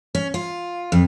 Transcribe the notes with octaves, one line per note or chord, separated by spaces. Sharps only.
C#4
F4
F2